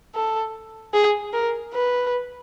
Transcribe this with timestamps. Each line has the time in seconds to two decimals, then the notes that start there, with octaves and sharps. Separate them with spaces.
0.15 A4
0.94 G#4
1.33 A#4
1.74 B4